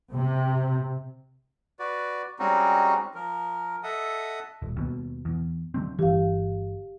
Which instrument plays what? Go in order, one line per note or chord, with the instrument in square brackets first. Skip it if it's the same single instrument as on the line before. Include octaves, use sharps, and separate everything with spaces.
[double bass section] C3
[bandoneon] F#4 B4 D5
G3 G#3 C4 C#4 D#4 F#4
F3 A#4
A4 D#5 E5 F#5 D#6
[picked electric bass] D#1
D#2 B2
E2
D3 F#3 C4
[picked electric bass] G1 E3 [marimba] G4 F5